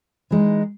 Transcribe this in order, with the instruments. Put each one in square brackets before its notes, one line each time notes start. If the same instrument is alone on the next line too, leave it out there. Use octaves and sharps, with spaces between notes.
[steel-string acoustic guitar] E3 G#3 D#4